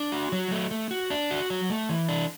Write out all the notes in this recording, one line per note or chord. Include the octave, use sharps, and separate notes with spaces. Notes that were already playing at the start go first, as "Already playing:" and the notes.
Already playing: D4
F#4
F#3
A3
A3
F#4
D4
F#4
F#3
A3
E3
D4